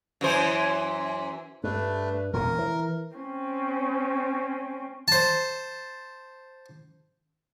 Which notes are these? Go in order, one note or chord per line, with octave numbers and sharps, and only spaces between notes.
F#2 E3 C5
G2 A3 D4 B4
E1 A#2 C#3 A#4
E3
C4 C#4
C5 A5